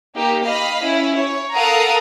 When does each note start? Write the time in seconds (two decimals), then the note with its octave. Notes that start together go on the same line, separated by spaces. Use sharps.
0.15 A#3 D#4 G4
0.45 D#5 F5 B5
0.84 C#4 E4
1.19 C#5
1.53 A4 A#4 F5 F#5 A#5 D#6